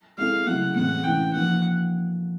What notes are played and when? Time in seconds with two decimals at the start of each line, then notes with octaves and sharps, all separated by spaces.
0.18 G#3 C4 E4 A4 F5
0.46 C#3 F#3 A3 C#4 E4 F#5
0.76 A2 E3 G#3 C4 F#5
1.04 A2 E3 G#3 C#4 G5
1.33 F3 A#3 D#4 F#5